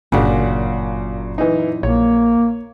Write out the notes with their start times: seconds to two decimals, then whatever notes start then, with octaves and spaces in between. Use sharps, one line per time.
0.12 G1 F#2 A#2 C#3 D4 F#4
1.38 E3 D#4
1.83 A#1 A#3 C#5